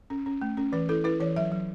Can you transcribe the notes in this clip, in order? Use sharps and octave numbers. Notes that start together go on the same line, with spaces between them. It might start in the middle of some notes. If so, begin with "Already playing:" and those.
C#4
C#4
A3
C#4
E3 B4
E4 A4
E4 B4
E3 C#5
F#3 E5
F#3